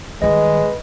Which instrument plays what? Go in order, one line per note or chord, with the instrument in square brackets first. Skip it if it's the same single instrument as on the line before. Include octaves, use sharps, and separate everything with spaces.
[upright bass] D#3 G3 [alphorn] G#3 [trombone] B4 [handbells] D#5